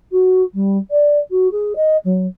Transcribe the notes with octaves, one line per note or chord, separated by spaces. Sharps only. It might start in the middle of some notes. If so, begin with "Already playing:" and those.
F#4
G3
D5
F#4
G#4
D#5
F#3